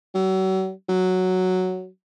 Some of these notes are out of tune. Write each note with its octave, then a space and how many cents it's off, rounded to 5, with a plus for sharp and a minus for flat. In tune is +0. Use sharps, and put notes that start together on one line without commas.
F#3 +40
F#3 +0